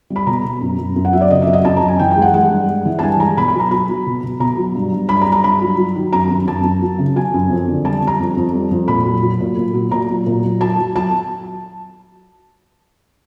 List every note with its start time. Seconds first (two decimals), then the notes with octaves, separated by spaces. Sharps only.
0.10 G3
0.16 B5
0.26 B2 A#5
0.44 B2
0.61 F#2
0.79 F#2
0.96 F#2
1.05 F#5
1.13 F#3 E5
1.21 D5
1.30 C#3 D#5
1.42 F#2 E5
1.53 D#5
1.65 F#2 A5
1.76 A#5
1.82 F#2
1.88 G#5
1.99 E3 G5
2.11 G5
2.16 G#3
2.22 F#5
2.33 G#3 F#5
2.51 G2
2.68 G#3
2.85 E3
2.99 A5
3.02 G2 G#5
3.20 G#3 A#5
3.37 B2 B5
3.48 B5
3.55 F#3
3.60 A#5
3.71 F#3 B5
3.89 F#3
4.07 B2
4.23 B2
4.40 B2 A#5
4.57 F#3
4.75 G2
4.92 G2
5.09 G2 B5
5.21 A#5
5.26 G2
5.32 A#5
5.44 G2 B5
5.62 F#3
5.78 F#3
5.96 D#3
6.13 F#2 A#5
6.30 F#2
6.48 F#2 A5
6.64 F#2
6.82 F#3
6.99 C#3
7.15 F#3 G#5
7.34 F#2
7.50 F2
7.68 D3
7.85 G3 A5
8.02 G3
8.07 A#5
8.20 F2
8.37 F2
8.54 G3
8.71 F2
8.88 A#2 B5
9.05 F#3
9.23 F#3
9.40 A#2
9.57 A#2
9.74 F#3
9.91 A#2 A#5
10.09 F#3
10.26 A#2
10.43 F#3
10.61 F#3 A5
10.78 F#3
10.95 F#3 A5